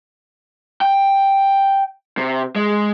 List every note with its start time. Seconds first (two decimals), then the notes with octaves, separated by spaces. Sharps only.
0.81 G5
2.18 C3
2.56 G#3